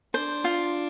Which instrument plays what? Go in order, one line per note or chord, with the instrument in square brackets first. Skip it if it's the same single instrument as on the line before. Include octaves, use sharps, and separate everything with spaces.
[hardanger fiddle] D4 [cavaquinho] C5
[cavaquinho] F4